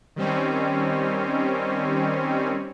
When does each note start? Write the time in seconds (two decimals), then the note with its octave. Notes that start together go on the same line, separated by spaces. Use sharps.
0.16 D#3 G3 C4 C#4